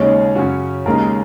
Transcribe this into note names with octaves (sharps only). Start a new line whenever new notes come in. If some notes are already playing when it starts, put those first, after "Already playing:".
Already playing: D#2 C#3 G#3 D#4 C#5
F#2 C#3 F#3 C#4 F#4
D#2 C#3 G#3 D#4 A#4